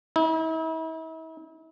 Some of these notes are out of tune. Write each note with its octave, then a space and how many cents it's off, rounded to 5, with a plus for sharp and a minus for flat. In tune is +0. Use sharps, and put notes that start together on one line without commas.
E4 -45